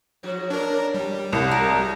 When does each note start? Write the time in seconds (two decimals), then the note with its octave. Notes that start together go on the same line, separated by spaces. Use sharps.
0.23 G#2 F3 F#4
0.50 D4 A#4 C#5
0.94 G3
1.33 C2
1.51 G#3 F#4 A#4